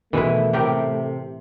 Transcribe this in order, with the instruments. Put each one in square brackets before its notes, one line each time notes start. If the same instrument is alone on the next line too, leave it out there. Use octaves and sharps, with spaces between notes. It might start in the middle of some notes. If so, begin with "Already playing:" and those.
[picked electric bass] B2 D#3 [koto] E3 G#3 E4 [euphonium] A3
[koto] A2 G4 A#4 [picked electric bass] C3